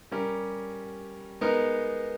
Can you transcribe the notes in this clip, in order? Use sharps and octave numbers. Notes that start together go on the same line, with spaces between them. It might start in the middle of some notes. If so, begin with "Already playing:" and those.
G3 C#4 G4 A#4
G#3 B3 D#4 A#4